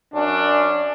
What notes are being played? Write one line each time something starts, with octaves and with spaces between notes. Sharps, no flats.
F#2 C#4 D4